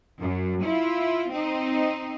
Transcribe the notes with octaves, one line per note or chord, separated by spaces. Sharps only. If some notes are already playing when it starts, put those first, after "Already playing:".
F#2
E4 F4
C4 D#4